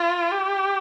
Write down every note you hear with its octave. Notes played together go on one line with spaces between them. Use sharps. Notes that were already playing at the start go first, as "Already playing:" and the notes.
Already playing: F4
G4